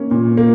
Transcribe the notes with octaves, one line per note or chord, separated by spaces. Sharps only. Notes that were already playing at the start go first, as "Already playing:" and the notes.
Already playing: A#3 C#4
A#2
A#3